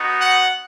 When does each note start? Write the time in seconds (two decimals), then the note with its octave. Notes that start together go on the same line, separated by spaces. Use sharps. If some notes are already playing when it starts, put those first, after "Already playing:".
Already playing: B3 D#4 F#4
0.21 F#5